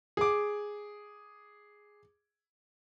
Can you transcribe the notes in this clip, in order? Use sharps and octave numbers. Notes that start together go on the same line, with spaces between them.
G#4 D6